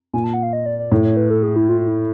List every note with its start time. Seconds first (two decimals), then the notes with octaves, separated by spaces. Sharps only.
0.13 A#2 G#5
0.24 A5
0.34 F#5
0.43 F5
0.53 D#5
0.66 D5
0.79 D5
0.91 A2 C#5
1.04 C#5
1.17 B4
1.30 A4
1.43 G#4
1.56 E4
1.69 F4
1.80 F4
1.88 E4